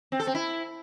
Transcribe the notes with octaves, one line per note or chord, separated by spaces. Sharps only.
C4
A4
C4
E4